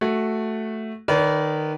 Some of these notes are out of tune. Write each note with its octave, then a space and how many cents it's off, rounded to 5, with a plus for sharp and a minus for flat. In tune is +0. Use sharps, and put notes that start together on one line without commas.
A3 +0 F#4 +5
D#3 -20 B4 +0 D5 -35